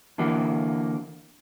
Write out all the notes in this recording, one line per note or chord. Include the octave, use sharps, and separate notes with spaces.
D3 E3 A#3 F#4